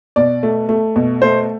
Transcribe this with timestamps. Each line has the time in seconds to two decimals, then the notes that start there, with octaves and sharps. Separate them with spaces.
0.16 B2 D5
0.43 A3
0.69 A3
0.96 B2
1.22 A3 C5